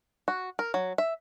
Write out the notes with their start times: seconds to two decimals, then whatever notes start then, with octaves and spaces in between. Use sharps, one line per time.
0.28 F#4
0.59 A#4
0.74 F#3
0.98 E5